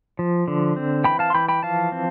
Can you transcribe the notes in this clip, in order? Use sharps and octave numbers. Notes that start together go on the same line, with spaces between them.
F3
D3
C4
E3 G5 B5
F5 A5
C6
E3 G5 B5
G5 B5
F3 F5 A5
C4